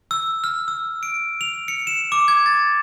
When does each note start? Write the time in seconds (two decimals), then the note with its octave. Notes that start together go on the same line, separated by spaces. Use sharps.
0.11 E6
0.44 F6
0.68 E6
1.03 D7
1.41 F7
1.68 C#7
1.87 E7
2.12 D6
2.28 G#6
2.46 A6